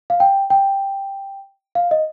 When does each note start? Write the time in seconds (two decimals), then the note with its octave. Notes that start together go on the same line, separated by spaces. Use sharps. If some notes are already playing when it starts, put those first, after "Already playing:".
0.10 F5
0.20 G5
0.50 G5
1.75 F5
1.91 D#5